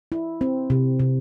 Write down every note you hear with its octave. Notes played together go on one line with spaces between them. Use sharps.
E4
C4
C3
C3